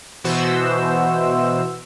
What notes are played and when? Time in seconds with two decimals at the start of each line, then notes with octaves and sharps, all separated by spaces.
0.24 B2 E3 B3 F#4 C5 E6